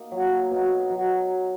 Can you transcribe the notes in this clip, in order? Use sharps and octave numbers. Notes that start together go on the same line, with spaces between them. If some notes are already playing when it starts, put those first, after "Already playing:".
Already playing: A#3 D#4
F#3
D#4
B2
D#4
F#3